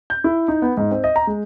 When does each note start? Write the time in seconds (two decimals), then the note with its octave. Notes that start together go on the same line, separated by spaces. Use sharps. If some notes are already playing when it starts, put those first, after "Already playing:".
0.10 G6
0.24 E4
0.48 D#4
0.62 B3
0.77 G#2
0.91 C4
1.04 D#5
1.16 A#5
1.27 G#3